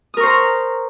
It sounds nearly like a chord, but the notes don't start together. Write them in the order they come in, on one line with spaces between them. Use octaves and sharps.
D#6 A#4 C#6 C5 A#5